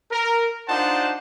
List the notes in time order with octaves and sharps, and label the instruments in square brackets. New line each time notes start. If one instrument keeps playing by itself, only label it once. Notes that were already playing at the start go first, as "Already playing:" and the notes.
[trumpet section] A#4
D4 D#4 F4 C5 F#5 A5